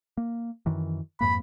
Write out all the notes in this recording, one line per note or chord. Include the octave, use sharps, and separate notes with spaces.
A#3
F#2 D#3 E3
F2 G#2 A#3 B5